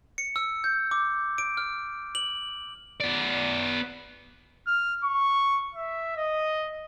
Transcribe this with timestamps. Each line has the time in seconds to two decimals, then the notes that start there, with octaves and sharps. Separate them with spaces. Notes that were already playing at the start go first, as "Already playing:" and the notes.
0.18 C#7
0.36 E6
0.64 G6
0.91 D6
1.38 D7
1.57 F6
2.15 F#7
3.00 B3 D5
4.67 F6
5.04 C#6
5.74 E5
6.17 D#5